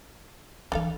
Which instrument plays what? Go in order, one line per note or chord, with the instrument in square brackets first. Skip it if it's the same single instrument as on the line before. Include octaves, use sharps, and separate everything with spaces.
[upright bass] E3 F3 [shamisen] D4 A4 F5